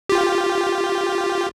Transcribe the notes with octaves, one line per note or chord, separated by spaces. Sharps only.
F4 G4